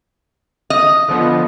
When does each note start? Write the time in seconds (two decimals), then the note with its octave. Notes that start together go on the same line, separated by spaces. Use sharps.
0.70 D#5
1.08 D3 F3 B3